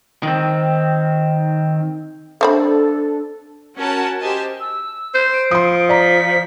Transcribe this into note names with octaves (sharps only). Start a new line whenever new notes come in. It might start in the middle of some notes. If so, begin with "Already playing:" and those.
D#3 C4
A3 C4 D4 A4 B5
C#4 F#4 A#4 F#5 A5
G4 C5 D#5 G#5 A5
E6
C5
D7
F3 C6 D#6
D5 A#5 B6